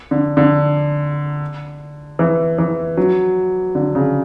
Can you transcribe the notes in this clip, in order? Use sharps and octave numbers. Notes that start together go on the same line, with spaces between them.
D3
D3
E3
E3
F#3
D3
C#3